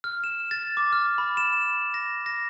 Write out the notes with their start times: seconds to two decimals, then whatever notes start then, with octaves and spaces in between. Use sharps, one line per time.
0.04 F6
0.24 E7
0.51 A6
0.77 D6
0.92 F6
1.18 B5
1.37 E7
1.94 A#6
2.26 A#6